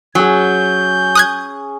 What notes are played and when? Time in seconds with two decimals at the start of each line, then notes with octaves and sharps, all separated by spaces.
0.15 F#3 C#4 G#4 G6
1.15 D#6 F#6 G#6